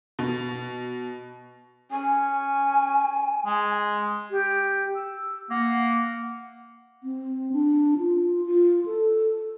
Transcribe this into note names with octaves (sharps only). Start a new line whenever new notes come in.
B2
C#4 G#5
G#3
G4
E6
A#3 F#5
C4
D4
F4
F4
A4